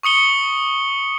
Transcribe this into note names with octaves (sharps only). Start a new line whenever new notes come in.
C#6 D#6 C#7 G7